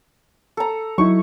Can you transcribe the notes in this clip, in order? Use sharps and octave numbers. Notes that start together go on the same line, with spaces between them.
A4 A#5
F#3 D#4 E4 C#6